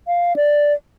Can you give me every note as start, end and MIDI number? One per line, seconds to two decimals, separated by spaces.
0.07 0.36 77
0.36 0.73 74